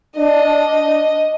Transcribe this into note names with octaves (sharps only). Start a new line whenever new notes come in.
D4 D#5